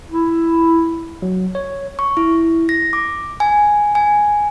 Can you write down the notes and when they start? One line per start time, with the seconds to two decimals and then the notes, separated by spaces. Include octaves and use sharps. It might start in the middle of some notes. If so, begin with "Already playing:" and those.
0.10 E4
1.22 F#3
1.55 C#5
1.99 C#6
2.17 E4
2.69 A#6
2.93 D6
3.40 G#5
3.95 G#5